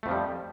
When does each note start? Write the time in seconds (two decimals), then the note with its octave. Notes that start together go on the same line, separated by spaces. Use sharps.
0.03 A3
0.06 F2
0.08 F3
0.11 G3